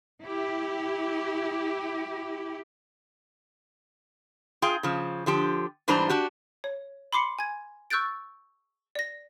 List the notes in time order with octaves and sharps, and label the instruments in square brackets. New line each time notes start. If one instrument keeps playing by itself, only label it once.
[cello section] E4 G4
[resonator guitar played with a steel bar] F4 G#4 F5 G5
C#3 F3
D3 F3 G4
G#2 E3 G3 D4 C5 A#5
D4 F#4 G4
[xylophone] C#5
B5 C6 D6 C7 C#7
G#5 G#6
C#6 E6 F#6 G6 A6 D7
D5 A#6